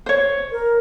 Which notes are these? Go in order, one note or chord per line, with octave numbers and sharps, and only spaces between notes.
C5 C#5
A#4